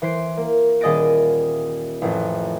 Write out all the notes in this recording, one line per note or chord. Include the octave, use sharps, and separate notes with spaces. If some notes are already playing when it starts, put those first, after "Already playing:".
E3 C5 C7 D7
A#3
D#1 G#4 D#5 A6 A#6 D7
A1 F2